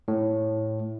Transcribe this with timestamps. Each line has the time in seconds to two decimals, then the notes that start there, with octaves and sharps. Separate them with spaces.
0.08 A2